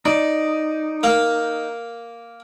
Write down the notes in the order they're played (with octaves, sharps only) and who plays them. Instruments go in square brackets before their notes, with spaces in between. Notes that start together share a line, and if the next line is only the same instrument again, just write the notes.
[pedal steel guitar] D#4 [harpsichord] D5
[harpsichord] A#3 F5